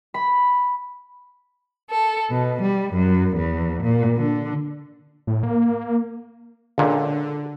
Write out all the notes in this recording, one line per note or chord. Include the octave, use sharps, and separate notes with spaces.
B5
A4
B2
G3
F#2
E2
A#2
D3
A2
A#3
C#2 A#2 D3